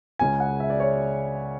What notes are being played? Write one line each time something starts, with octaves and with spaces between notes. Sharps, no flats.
C#2 C#3 G#3 G#5
F#5
E5
D5
C#5